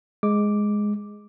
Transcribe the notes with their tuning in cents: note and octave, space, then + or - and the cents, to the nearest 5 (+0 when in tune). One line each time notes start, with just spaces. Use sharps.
G#3 +0 D6 +0